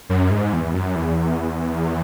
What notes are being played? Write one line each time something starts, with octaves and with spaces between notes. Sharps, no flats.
F#2
G#2
E2
F#2
E2